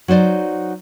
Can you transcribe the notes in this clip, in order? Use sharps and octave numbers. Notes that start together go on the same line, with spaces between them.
F#3 D#4 C5 D5